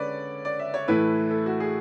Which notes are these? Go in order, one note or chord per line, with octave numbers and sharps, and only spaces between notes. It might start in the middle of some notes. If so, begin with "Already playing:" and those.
Already playing: D3 G#3 C#4 B4 C#5 D5
D5
E5
C#5
A2 E3 A3 E4 B4
A4
F#4
G#4